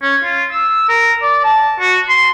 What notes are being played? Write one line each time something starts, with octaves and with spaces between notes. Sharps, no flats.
C#4
F4
E6
A#4
D5
A5
F#4
C6